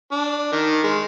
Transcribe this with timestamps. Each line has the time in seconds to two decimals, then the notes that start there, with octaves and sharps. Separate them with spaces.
0.12 D4
0.52 D#3
0.84 G#3